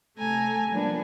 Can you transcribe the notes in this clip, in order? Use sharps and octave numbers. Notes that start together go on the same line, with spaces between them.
C3 A3 A4 G#5 A#5
F3 G3 A#3 B3 D4